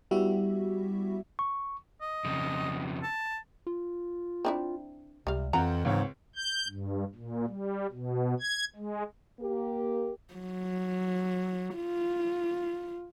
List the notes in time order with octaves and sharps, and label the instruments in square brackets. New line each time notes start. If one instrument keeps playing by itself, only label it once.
[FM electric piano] G3 B3 E4 F#4 G4 E5
[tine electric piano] C#6
[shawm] D#5
[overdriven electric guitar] F2 C#3
[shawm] A5
[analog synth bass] F4
[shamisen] C4 D4 E4
[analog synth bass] C#2 [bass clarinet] C3 [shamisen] G3 F5
[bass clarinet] F2 [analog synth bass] E3 [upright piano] C4 F4 F#5 [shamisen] A#5
[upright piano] C#2 C4 C#5 [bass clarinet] G#2
[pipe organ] G6
G2
A#2
G3
B2
G#6
G#3
[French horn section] A#3 G4 A#4
[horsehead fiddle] F#3
F4